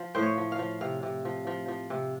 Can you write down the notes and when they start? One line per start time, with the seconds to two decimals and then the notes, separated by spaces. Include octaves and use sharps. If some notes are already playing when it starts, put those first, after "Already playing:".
Already playing: F3
0.15 A2 C5
0.23 C#5
0.37 F3
0.52 F5
0.59 F3
0.81 C3 F5
1.03 C3
1.25 F3
1.47 F3
1.68 F3
1.90 C3